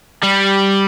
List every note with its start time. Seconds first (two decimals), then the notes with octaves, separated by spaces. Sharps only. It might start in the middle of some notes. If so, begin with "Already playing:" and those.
0.23 G3